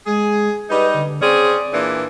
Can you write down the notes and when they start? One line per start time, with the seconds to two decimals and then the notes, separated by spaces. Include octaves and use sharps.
0.06 G#3 G#4
0.69 G3 D#4 B4
0.94 D3
1.22 C4 C#4 G#4 D5
1.73 A#2 E3 D4